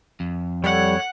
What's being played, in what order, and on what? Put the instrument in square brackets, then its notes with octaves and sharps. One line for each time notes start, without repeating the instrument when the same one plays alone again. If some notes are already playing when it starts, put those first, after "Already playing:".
[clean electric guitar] F2
[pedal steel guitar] G3 [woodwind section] A4 C#5 [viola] F#5